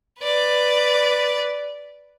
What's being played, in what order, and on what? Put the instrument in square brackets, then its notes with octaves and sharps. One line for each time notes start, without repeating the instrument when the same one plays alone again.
[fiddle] B4 D5